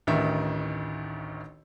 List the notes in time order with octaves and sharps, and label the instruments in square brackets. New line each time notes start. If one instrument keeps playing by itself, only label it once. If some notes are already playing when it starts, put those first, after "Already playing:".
[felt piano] A1 D2 D#3 D#4 E5